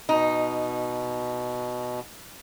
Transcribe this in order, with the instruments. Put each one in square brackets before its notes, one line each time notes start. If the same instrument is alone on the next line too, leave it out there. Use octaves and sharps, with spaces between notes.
[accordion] B2 [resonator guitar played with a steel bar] D#4